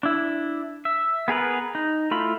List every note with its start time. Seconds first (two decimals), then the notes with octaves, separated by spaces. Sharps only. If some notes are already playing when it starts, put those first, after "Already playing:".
0.03 D4 E4
0.85 E5
1.28 B3 G#4 A#4 B4
1.75 D#4
2.11 A3 E4 F4 B5